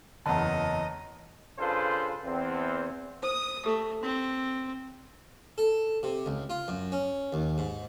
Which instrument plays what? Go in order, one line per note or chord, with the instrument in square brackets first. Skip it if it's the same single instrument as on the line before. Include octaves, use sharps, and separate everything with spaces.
[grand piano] F#1 E2 [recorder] D#5 [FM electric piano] A5 A#5
[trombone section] C#3 D4 F4 A4 B4 C5
E2 C4
[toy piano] C5 [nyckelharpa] D#6
[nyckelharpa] A3 [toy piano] G4 A4 D#6
[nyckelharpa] C4 [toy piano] C6
[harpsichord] A4
C3
C#2
F4
F#2
C#4
D#2
G#2